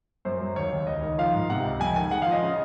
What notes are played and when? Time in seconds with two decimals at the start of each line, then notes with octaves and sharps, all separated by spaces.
0.25 F#2 C5
0.41 F#3
0.56 D#2 C#5
0.72 D#2
0.87 C#2 D#5
1.02 D#3
1.18 F3 F5
1.34 G#2
1.50 C3 F#5
1.64 C#2
1.80 F2 G#5
1.95 D#3 G#5
2.11 G#3 F#5
2.22 F5
2.26 F3
2.32 D#5
2.43 C#3